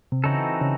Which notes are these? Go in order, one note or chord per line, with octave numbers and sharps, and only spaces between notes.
C3
C#3 E3 C4 D#4 F#4 A4
C#3